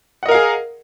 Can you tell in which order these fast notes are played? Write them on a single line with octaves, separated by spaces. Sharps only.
F#5 D#5 A#4 F5 G#4